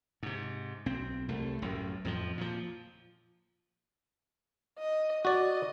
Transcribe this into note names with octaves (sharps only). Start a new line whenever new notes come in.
G#2 C3
B1 C4
C2 A3
A1 F#2 A2
F2 A2 E3 F3
A#2 F3
D#5
F#4 D5 D#5